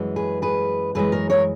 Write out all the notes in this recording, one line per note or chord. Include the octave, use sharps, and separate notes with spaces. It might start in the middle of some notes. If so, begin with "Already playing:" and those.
Already playing: F#2 E3 G#3
G#4 B4
G#4 B4
F#2 E3 G#3 G#4 B4
A#4 C#5
A#4 C#5